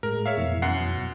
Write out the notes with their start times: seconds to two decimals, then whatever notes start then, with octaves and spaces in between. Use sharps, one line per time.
0.03 A2 G#3 A#4
0.26 C#5 E5 F5
0.38 F2 B2 E3
0.62 F#2 F#5 C7